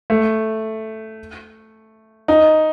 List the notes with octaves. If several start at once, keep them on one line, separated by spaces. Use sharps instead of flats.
A3
D#4